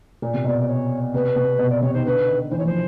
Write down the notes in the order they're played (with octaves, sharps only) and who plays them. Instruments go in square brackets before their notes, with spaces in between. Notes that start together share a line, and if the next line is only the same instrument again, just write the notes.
[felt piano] A#2
C3
[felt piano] B2 [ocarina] D5
[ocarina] D5
C#5
[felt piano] C3 [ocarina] B4
[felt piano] C3
B2
[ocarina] D5
[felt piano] C3 [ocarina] C#5
[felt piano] D#3 [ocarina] C5
[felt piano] D3 [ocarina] B4
[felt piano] D#3
[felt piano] E3 [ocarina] C5
[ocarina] C#5
[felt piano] F3 [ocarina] C5